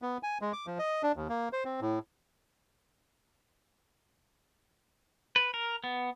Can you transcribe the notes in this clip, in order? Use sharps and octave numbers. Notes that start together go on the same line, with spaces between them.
B3
G#5
G#3
D6
F3
D#5
D4
D#2
A#3
C5
C4
A2
B4
A#4
B3